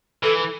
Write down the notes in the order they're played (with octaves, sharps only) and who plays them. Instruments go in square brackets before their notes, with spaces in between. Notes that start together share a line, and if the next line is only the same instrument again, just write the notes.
[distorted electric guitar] E3 [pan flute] A4